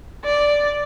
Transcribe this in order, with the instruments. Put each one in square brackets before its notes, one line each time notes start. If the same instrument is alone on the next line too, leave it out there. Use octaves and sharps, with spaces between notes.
[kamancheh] D5